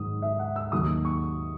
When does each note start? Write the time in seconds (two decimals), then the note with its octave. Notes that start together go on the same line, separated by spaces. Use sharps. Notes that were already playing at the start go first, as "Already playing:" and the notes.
Already playing: G#2 D#3 F#3 D#6
0.22 E5
0.39 F#5
0.56 E6
0.72 D#2 D#3 F#3 D#6
1.05 C#6